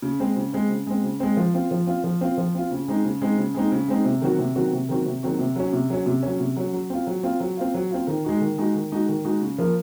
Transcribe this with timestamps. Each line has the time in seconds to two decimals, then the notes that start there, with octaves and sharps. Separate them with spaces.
0.02 C#3
0.20 G#3 C4
0.36 C#3
0.53 G#3 C4
0.69 C#3
0.87 G#3 C4
1.03 C#3
1.20 G#3 C4
1.37 F3
1.54 C4 F4
1.71 F3
1.87 C4 F4
2.04 F3
2.21 C4 F4
2.37 F3
2.55 C4 F4
2.71 C#3
2.88 G#3 C4 D#4
3.04 C#3
3.22 G#3 C4 D#4
3.38 C#3
3.55 G#3 C4 D#4
3.72 C#3
3.88 G#3 C4 D#4
4.05 C3
4.21 D#3 F#3 C4 F#4
4.39 C3
4.55 D#3 F#3 C4 F#4
4.72 C3
4.89 D#3 F#3 C4 F#4
5.06 C3
5.23 D#3 F#3 C4 F#4
5.39 C3
5.56 F#3 C#4
5.73 C3
5.90 F#3 C#4
6.06 C3
6.23 F#3 C#4
6.40 C3
6.56 F#3 C#4
6.73 F#3
6.90 C4 F4
7.07 F#3
7.23 C4 F4
7.40 F#3
7.57 C4 F4
7.74 F#3
7.91 C4 F4
8.07 D#3
8.24 G#3 D#4 F#4
8.41 D#3
8.58 G#3 D#4 F#4
8.75 D#3
8.92 G#3 D#4 F#4
9.09 D#3
9.25 G#3 D#4 F#4
9.42 C#3
9.58 F3 A#3